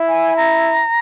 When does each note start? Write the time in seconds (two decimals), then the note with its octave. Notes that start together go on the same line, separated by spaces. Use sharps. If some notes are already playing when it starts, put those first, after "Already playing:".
Already playing: E4
0.08 G#5
0.37 A#5